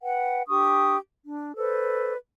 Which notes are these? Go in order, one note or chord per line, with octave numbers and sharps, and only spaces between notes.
B4 F#5 G5
D4 G4 C#6 D#6
D4
A4 B4 C5 D5